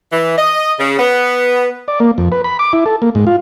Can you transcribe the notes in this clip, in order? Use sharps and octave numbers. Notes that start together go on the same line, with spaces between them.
E3
D#5
C#3
B3
D5
A#3
F2
B4
B5
D6
E4
A4
A#3
G#2
F4